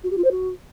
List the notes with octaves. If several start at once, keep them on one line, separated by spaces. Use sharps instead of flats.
F#4
G4
F4
C5
F#4